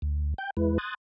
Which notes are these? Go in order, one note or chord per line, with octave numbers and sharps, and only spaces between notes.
D2
G5 G6
E2 G#3 E4 B4
C6 D#6 F#6 G#6 A6